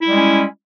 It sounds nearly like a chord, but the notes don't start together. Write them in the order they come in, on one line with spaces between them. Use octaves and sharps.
E4 G3 G#3 C#4